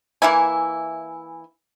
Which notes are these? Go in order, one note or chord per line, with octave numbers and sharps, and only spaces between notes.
E3 A#3 E4 G#5